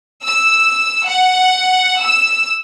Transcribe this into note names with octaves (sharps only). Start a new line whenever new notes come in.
E6
F#5
E6